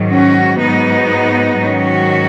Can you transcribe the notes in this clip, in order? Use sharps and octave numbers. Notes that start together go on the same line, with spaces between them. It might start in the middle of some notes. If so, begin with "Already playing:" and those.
Already playing: G#2 D#3 F#3
C#4 F#4
G#2 F#3 B3 D#4
G#2 D#3 F#3 C#4 F#4